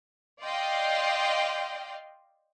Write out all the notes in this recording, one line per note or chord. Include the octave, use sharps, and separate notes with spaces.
D5 D#5 F5 G5 C6